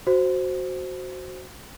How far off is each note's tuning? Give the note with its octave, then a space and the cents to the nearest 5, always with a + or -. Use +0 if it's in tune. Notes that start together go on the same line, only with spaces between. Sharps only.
F#4 +0 C5 +0